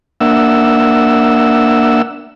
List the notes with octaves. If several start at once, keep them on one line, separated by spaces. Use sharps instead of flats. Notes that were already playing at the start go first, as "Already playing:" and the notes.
A#3 D4 E5 F#5 E6